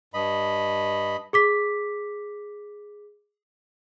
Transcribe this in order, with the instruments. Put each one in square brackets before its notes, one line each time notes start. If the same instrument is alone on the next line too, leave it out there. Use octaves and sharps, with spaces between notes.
[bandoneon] G2 D#5 B5
[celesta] G#4 D6 B6